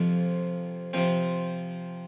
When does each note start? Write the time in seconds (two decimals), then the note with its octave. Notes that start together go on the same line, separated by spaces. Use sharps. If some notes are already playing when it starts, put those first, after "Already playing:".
Already playing: F2 C3 F3
0.93 C3 F3 C4